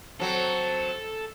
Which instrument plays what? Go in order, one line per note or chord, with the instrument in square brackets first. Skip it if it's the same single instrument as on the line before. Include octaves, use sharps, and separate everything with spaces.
[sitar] F#3 C4 [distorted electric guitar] A4